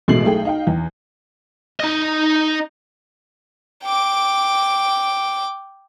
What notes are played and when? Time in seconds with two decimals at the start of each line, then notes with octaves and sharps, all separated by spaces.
0.08 A1 B2 G#3 A3 C7 F#7
0.24 B1 A3 G#4 G5
0.45 D#4 F5 G5
0.67 E2
1.80 D#4 D#5
3.84 G5 D6